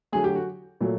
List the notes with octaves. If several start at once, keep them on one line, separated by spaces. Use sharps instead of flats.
D3 F#3 A3 G#4
G4
F#4
A#2 F#3 A3